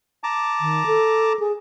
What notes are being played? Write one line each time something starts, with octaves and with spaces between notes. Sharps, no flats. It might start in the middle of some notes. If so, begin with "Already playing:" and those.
A5 A#5 D6
D#3
A4
G#4